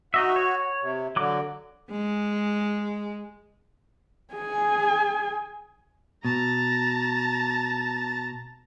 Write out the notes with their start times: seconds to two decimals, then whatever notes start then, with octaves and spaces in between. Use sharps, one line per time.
0.14 D#4 F#4 D#5 E5
0.36 C#5
0.82 C3
1.16 D3 F#3 D6
1.91 G#3
4.34 G#4 G#5
6.25 B2 A5 A#5